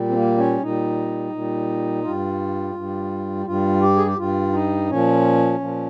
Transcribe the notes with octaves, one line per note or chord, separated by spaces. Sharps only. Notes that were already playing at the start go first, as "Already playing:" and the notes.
Already playing: A#2 G3
C4
A#3
C#4
A#2 G3 D#4
A#2 G3
G2 G3 F4
G2 G3
G2 G3 F4
G4
G#4
G4
G2 G3 F4
D#4
A#2 F3 C#4
A#2 F3